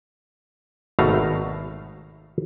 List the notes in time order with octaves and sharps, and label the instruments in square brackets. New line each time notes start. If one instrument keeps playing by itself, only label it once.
[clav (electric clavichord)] G#1 B2 A3 F5 A#5